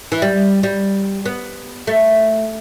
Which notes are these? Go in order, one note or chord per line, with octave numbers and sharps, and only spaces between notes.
E3
G3
G3
B3
A3